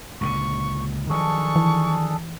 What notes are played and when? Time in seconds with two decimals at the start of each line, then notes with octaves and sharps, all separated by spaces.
0.21 C#2 A#2 D3 C#6
1.10 D#3 F3 F#3 D4 G#4 A4 C#6
1.56 E3